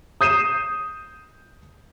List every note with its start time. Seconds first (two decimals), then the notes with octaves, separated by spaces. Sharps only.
0.21 D#6 G6 C7 D#7 E7